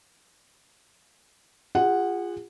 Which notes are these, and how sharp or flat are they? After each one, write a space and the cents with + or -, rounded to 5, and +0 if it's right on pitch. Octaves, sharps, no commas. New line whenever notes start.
F4 -5 G#4 -35 F#5 +0